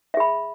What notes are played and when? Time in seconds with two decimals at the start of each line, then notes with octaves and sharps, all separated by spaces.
0.14 E5
0.17 G#4
0.20 B5